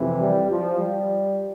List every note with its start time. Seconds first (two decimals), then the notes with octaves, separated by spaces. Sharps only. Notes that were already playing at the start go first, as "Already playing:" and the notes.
Already playing: F2 C3 E3
0.20 G3
0.50 F3
0.80 G3